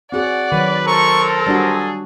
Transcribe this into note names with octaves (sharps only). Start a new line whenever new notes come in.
C4 F#4 G#4 D5 F#5
D#3 F#3 B4 C#5
A4 A#4 C5 A#5 C#6
G3 D4 F#4 G#4